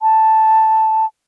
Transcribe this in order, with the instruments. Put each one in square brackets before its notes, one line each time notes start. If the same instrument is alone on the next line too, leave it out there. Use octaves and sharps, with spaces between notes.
[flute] A5